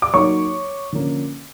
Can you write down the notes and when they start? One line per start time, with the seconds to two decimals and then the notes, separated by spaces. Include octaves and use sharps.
0.02 D6
0.13 F#3 A#3 D#4 C#5 C#6
0.92 D3 F3 A#3 C#4